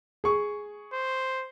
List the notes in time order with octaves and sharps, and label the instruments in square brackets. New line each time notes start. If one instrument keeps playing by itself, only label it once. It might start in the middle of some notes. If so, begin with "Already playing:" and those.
[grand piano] G#4 C#6
[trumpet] C5